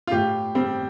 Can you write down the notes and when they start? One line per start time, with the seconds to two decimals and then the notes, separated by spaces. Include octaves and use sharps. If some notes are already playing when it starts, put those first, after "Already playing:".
0.07 F4
0.11 A2 G4
0.55 G3 C4